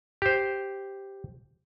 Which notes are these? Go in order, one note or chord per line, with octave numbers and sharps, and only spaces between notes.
G4 C5